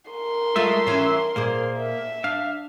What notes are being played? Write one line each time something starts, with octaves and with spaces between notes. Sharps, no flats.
A#4 C6
G#3 A3 F4 E5
E3 C#4
A#2 A#3 G#4 C5
E5
D4 F5